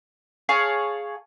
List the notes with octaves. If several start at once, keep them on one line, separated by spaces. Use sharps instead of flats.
G#4 C#5 F5 A5